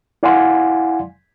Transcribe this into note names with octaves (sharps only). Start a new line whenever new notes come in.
E4 D5 F5 F#5 G#5 C6